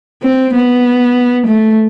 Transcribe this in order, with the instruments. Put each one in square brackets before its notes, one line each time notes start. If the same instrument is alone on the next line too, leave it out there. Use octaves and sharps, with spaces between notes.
[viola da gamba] C4
B3
A3